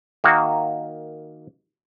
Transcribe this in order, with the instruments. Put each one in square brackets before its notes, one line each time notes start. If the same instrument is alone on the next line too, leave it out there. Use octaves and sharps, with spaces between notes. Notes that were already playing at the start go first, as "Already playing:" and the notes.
[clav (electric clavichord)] D#3 A#3 F#4